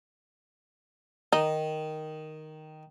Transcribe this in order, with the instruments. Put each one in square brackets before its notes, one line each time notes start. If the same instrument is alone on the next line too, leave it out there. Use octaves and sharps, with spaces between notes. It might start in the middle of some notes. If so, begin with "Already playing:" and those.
[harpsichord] D#3 [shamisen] D#4